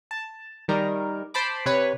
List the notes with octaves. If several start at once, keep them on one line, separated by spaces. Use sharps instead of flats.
A5
D#3 G3 A#4
C5 A5 B5 D6
C3 B4 C#5